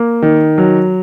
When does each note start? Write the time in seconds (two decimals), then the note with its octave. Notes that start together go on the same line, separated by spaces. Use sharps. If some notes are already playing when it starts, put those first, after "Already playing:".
Already playing: A#3
0.22 D#3
0.58 F#3